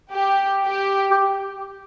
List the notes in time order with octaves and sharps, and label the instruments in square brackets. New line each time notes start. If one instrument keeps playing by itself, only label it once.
[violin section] G4
G4
[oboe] G4